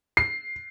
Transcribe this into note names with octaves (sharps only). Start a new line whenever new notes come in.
C7